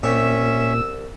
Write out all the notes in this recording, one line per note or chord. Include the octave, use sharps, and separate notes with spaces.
C2 A#2 C#4 G4 E5 C#6 E6